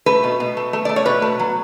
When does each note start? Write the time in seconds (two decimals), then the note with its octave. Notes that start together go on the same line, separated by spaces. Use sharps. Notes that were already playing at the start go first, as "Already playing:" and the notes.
0.06 A3 B4
0.24 B2
0.40 B2
0.57 A3
0.73 A3
0.85 A3 D5
0.96 C#5
1.06 B2 B4
1.22 A3
1.39 F#3